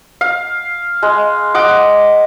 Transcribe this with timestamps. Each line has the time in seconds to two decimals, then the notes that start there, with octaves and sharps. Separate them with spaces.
0.21 F5
1.02 G#3
1.55 D#5 F#5 D6